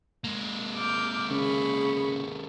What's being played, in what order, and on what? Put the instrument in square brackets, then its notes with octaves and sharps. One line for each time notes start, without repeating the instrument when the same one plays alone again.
[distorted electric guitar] G#3 A#3
[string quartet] D6 F6 G6
[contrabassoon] C#3 [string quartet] G#4 B5 C#6